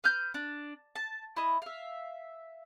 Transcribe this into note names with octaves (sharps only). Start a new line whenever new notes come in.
B4 F6 G6
D4
A5
E4 D#5
E5 F5